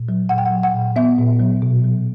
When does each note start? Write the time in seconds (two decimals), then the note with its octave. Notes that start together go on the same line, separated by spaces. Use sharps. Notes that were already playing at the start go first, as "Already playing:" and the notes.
Already playing: A#2
0.09 F#3
0.29 A#2 F#5
0.38 G5
0.46 F#5
0.51 F#3
0.63 F#5
0.74 A#2
0.96 B3 E5
1.18 A#2
1.39 F#3
1.62 B2
1.84 F#3